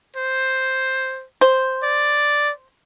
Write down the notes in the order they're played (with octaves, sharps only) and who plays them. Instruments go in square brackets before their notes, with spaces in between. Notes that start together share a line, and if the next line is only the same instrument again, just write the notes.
[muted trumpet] C5
[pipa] C5
[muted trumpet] D5